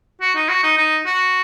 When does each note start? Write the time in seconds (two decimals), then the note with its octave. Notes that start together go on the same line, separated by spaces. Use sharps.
0.21 F#4
0.36 D#4
0.49 F#4
0.63 D#4
0.78 D#4
1.06 F#4